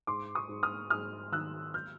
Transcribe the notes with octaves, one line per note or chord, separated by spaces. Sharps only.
G#2 C6 D6
C#6 D#6
G#2
D#6 F6
G#2 D#6 F6
D#3 E6 F#6
F6 G6